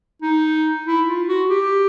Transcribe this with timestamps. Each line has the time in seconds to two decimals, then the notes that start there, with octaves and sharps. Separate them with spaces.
0.22 D#4
0.86 E4
1.07 F4
1.28 F#4
1.49 G4